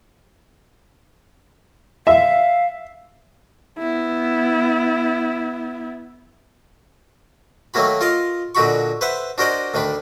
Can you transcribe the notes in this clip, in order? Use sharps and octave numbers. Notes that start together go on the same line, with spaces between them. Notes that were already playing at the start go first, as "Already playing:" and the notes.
E5 F5
B3 E4
D#3 F#3 A3 A#3 F#4 B5
F4 A#4 D#5 F5
A#2 D3 D#4 F#4 B5 C#6
B4 C5 E5 F#5
D4 F#4 A#4 C5 D5 D#5
D2 D#3 D4 B5